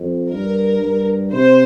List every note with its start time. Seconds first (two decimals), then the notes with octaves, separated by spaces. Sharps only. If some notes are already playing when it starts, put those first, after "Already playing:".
Already playing: F2
0.31 G2 A#4
0.81 G2
1.32 C3 C5